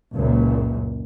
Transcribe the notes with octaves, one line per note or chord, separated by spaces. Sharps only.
F#1 C#2 F#2 A#2